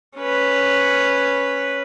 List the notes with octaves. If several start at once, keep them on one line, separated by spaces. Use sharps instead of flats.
C#4 B4